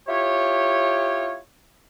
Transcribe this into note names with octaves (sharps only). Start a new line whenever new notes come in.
E4 F4 G4 C#5